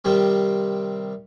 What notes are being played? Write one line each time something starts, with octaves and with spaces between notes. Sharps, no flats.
C3 D#3 G3 C4